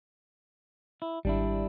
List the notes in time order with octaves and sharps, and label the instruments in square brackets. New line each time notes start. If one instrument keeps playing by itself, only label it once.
[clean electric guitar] E4
[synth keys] G#1 [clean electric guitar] G3 D4 E4